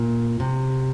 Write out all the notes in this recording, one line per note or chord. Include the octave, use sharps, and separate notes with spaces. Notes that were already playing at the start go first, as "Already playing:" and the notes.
Already playing: A#2
C3